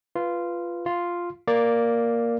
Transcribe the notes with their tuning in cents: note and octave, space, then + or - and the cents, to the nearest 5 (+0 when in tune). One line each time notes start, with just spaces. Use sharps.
F4 -10 B4 +0
F4 +0 F5 +0
A#3 +0 D5 +0